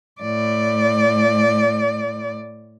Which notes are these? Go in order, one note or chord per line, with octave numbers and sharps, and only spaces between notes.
A2 D5